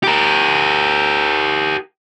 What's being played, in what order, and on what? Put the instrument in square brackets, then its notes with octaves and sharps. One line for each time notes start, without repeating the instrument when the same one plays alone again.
[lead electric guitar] G4 A#4